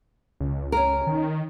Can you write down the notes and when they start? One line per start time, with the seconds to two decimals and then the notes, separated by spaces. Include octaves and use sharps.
0.40 C#2
0.72 C#4 A#4
1.07 D#3